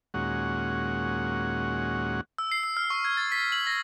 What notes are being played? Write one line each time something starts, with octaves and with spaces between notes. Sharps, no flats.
D#2 A#2 G#3 C#4 F#4 F#5
E6
C7
E6
F6
C#6
G#6
A6
B6
F#7
A#6